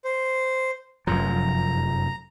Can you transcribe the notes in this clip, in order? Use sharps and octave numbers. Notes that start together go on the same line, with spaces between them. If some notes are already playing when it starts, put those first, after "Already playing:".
C5
F1 F#2 F3 A#5